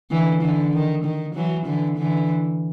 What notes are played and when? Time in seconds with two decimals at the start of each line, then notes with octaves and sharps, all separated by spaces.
0.11 D3 E3
0.42 D3 E3
0.73 D#3
1.04 D#3
1.35 E3 F#3
1.66 D3 E3
1.97 D3 E3